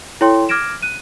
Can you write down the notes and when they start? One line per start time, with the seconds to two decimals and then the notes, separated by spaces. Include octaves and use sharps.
0.21 E4 A4 C#5 G5 C6
0.49 D6 F6 G#6 A#6 D7 E7
0.82 F#6 D#7